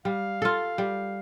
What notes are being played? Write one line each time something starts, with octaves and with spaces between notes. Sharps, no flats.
G3 F5
F4 A4
G3